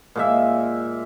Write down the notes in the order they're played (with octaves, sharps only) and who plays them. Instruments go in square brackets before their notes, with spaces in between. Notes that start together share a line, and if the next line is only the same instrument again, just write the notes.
[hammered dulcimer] A#2 G#3 E5